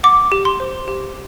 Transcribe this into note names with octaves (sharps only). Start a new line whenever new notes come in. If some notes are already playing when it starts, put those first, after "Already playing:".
F#5 D6
G4
C6
C5
G4